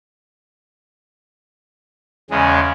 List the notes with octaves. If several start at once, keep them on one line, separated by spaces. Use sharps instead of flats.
E2 C#3 G#3 G#5